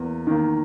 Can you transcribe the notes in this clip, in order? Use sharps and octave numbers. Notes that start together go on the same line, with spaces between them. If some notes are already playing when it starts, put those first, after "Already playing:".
Already playing: E2 A#3
D#3 A#3